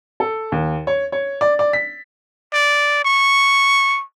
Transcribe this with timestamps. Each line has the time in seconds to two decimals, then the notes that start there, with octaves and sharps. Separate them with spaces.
0.20 A4
0.52 D#2
0.87 C#5
1.12 C#5
1.41 D5
1.59 D5
1.73 B6
2.53 D5
3.05 C#6